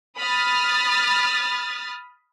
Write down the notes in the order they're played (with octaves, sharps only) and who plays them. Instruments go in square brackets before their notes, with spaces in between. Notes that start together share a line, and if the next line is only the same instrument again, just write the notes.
[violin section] B5 D#6 F6 A6